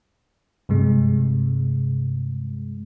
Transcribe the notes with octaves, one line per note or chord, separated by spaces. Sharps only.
G2 C3 G#3